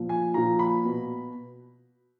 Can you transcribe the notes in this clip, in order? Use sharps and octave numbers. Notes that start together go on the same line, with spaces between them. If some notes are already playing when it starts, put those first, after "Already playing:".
Already playing: A#2 F3
G#5
A#2 F3 A#5
B5
B2